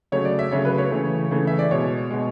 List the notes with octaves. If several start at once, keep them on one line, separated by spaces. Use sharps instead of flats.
C#3 F#3 A3 C#5
D5
E5
C#3 F#3 A3 C#5
B4
C#5
C#3 E3 A3
C#3 E3 A3
E5
D5
B2 G#3 C#5
B2 G#3